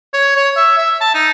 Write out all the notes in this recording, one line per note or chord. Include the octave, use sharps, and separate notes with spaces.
C#5
C#5
E5
E5
A5
D#4